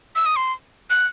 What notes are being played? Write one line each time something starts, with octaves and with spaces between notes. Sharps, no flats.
E6
D#6
C6
F#6